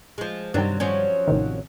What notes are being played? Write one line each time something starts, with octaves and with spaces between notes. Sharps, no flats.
F3 G#3
G2 C3 D#3 F#3 G3 D4
F3 F#3 C#4
A1 C3 D#3